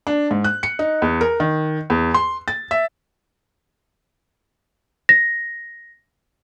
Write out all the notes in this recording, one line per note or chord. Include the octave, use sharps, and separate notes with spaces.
D4
G#2
F#6
C#7
D#4
E2
A#4
D#3
E2
C6
A6
E5
A#6